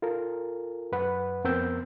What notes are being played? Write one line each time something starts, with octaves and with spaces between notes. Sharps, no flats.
F4 A4 A#4
F#2 B4 F#5
F2 B3 C4 A#4 E6 G6